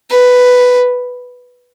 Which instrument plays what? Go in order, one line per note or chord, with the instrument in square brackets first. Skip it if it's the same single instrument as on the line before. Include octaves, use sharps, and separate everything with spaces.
[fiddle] B4